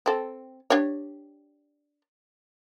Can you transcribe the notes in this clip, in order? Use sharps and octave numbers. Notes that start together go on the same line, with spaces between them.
C4 A4
D4 G4 C#5